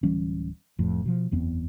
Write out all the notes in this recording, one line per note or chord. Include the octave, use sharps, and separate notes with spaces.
D1 E3 G3 C#4
F1 F2 A2
B2 F3
F#1 E2 B3 C4